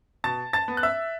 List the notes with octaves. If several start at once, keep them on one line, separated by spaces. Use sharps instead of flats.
B2 A5 A6
A5 A6
B3
F#6
E5 E6